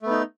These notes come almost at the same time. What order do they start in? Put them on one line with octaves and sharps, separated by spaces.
A3 B3 D#4